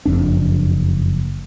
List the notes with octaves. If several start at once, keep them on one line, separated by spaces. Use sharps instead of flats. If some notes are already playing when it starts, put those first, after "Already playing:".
F#1 F2 D4